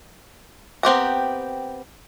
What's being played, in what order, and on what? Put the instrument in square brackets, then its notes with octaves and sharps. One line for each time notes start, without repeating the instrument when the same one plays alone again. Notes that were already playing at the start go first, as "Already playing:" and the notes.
[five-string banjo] B3 C4 G4 A#5